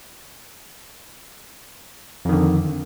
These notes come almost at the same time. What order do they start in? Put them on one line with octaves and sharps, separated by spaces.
F2 D#3 D3